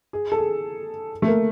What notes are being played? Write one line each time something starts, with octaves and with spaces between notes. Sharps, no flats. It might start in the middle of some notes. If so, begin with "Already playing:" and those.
G#4
A4
G#4
A3
A#3